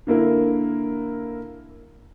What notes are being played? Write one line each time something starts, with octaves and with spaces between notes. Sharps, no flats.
D3 A#3 E4 A#4